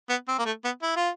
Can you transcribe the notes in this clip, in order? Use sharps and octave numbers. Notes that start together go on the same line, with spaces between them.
B3
C4
A#3
A3
B3
E4
F4